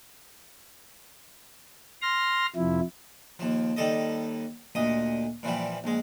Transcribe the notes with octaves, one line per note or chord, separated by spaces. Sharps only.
C6 F6 A#6
F2 C3 F3 E4
D#2 F3
D#2 G3 A4 D#5
D2 A#2 D#5 D#6
A#2 E3 F3 G3
A#1 G#3